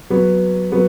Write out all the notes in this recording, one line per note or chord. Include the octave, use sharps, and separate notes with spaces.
F#3 B3
F#3 B3